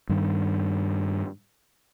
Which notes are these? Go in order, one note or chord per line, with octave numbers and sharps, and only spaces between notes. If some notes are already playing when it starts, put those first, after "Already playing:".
G2 D#3